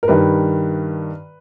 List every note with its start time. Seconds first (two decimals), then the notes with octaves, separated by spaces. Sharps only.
0.03 A#4
0.08 G2 D#3 B4